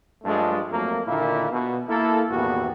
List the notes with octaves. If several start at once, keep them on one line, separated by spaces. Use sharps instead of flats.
G2 F3 G#3 A3 D4 F4
F2 F#3 A3 A#3 A#4
A#2 D3 D#3 A#3 E4 F4
B2
A#3 E4 A4
G#1 E2 A#2 B3 F#4 G4